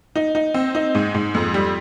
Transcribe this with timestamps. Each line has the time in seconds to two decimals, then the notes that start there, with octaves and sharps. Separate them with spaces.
0.16 D#4
0.35 D#4
0.54 C4
0.75 D#4
0.95 G#2
1.14 G#2
1.35 F2
1.54 G3